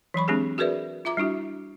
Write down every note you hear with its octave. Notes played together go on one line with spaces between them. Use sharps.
E3 F#3 B5 C#6
G#3 C4 D4 G4 G#4
F#4 G#4 A#4 B4 D5 E5
F4 E5 A#5 D6
G3 D4 E4 F#4